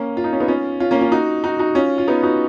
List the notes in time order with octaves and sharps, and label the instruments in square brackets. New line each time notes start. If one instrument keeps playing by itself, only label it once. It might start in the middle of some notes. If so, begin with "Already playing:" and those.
Already playing: [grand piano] A#3 C#4
F4
D#4
C#4
B3 D#4
C#4 F4
C#4 F4
A#3 C#4
C#4 F4
D#4 F#4
D#4 F#4
D#4 F#4
C#4 F4
F4
B3 D#4
D#4 F#4